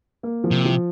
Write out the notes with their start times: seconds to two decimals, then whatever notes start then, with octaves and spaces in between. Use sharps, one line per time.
0.23 A#3
0.44 F3
0.51 C3
0.65 F3